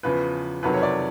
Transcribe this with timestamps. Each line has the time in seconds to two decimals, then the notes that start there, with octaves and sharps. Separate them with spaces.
0.03 E2 C#3 F3 B4
0.63 F2 C3 D#3 F#3 B4
0.73 C#5
0.83 D5